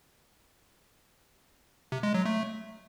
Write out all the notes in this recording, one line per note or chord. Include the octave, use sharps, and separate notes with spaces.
C3
G#3
F#3
A3